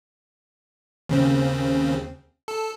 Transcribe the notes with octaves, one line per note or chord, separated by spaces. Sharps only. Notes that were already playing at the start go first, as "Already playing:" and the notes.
D#2 C#3 C4
A4